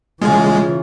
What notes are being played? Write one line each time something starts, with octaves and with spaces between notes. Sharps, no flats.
C#3 E3 G#3 F4 G#5